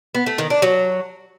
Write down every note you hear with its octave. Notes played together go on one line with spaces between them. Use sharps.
B3
A3
D#3
D4
F#3